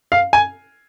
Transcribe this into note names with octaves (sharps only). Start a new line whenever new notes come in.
F5
G#5